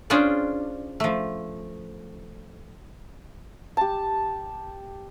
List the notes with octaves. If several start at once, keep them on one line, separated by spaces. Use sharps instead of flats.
C#4 D4 F4 G#4 C5 D5
F3 A3
G4 A5